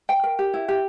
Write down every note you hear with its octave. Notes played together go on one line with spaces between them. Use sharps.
G5
A#4
G4
E4
G4